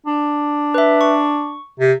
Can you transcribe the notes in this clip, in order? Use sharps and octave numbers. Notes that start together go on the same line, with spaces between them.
D4
B4 E5
C#6
C3